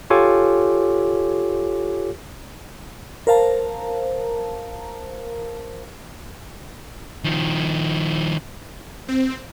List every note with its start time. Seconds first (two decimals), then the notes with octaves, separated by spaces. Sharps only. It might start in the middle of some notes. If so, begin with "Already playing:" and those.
0.10 F4 G4 A4 C#5 G#5 D6
3.27 A#4 C5 F5 A5 A#5
7.24 D#3 F3
9.08 C4